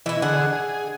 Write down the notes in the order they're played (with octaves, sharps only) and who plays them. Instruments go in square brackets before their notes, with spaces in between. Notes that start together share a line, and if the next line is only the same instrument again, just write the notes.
[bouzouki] B2 E4 [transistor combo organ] E3
[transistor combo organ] D3 G#4 [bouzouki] F#5
[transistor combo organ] G#4